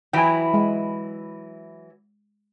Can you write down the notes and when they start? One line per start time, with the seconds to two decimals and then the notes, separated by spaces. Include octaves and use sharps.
0.13 E3 F#3 E4 G5 G#5
0.54 G#3